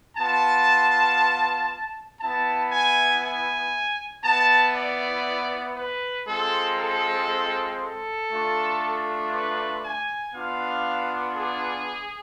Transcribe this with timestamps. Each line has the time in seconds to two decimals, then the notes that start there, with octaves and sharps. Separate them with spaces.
0.17 B3 F4 A5
2.20 B3 E4 A5
2.72 G#5
3.23 G#5
4.24 B3 E4 A5
4.75 D5
5.77 B4
6.28 G#3 C4 F4 A4
6.78 A4
7.80 A4
8.31 A3 D4 F4
9.33 B4
9.84 G#5
10.35 B3 D4 F4 F5
11.37 G#4